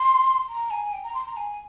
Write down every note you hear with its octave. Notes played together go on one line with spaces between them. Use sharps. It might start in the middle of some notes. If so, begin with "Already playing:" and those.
Already playing: C6
A#5
G#5
G5
A#5
C6
A#5
G#5